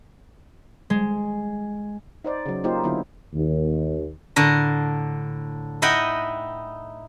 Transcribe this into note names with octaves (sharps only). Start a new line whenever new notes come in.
G#3
D#4 C5 D5
C#3 F#3
A#3 D#4 F4 G4 C5
D3 F#3 B3 E4
D#2
A2 D3 A#4
D#4 E4 D#5 F#5 G5